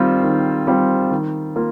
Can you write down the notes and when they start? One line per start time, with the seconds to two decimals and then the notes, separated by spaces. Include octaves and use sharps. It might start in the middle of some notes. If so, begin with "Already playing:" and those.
Already playing: D#3 G3 C4 F4 C5
0.23 D#3
0.67 G3 C4 F4 C5
1.11 D#3
1.56 A#3 F4